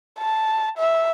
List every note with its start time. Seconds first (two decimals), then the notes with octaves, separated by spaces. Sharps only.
0.19 A5
0.78 E5